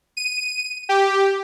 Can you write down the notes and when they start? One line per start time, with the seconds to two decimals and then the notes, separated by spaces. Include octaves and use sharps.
0.17 D#7
0.89 G4